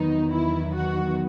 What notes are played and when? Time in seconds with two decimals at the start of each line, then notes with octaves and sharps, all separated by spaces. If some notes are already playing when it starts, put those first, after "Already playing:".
Already playing: E2 D#3 F#3 B3 D#4
0.33 E4
0.75 F#4